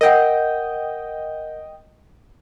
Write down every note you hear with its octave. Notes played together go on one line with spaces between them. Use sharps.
A#4 D#5 F#5 G5